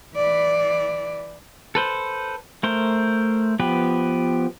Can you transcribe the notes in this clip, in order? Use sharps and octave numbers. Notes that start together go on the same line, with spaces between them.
E3 D5
A4 B4 C5
A3 A#4 C5
F3 B3 G4 B4